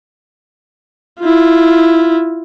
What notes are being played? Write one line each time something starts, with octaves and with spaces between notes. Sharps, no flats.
E4 F4